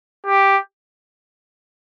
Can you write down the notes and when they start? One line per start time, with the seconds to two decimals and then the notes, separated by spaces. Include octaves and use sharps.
0.27 G4